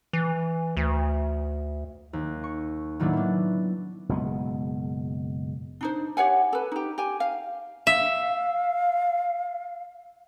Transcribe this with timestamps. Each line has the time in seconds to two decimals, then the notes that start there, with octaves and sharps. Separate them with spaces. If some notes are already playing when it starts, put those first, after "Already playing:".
0.13 E3
0.77 D2
2.13 D#2
2.44 C#6
3.00 A2 D#3 F#3 A#3 D4 E4
3.13 B3 D4
4.09 F#1 B2 G#3 B3
5.81 D4 D#4 C5
6.17 G4 C#5 F#5 G#5
6.53 A4 B4
6.72 D#4 G4
6.98 G4 G#5
7.20 F5
7.87 E5 F5